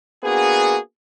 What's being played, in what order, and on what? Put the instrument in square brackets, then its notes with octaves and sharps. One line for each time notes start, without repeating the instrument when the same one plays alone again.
[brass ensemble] A#3 B3 D4 F#4 G#4